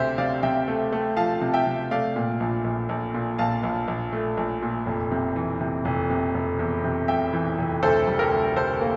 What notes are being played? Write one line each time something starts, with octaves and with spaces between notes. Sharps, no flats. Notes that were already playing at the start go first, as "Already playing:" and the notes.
Already playing: D2 C3 G4 C5 E5
C3 D5 F5
C3 E5 G5
A3
A3
F3 F5 A5
C3
E5 G5
C3
A3 D5 F5
A#2
A#1
A#1
A#1
A#2
A#1 F5 A5
A#1
A#1
A3
A#1
A#2
F1
C3
E3
C3
F1
C3
F1
E2
C3
F1 E5 G5
E3
F1
D2 A4 C5
G3
G4 A#4
D2
D3 A4 C5
A#3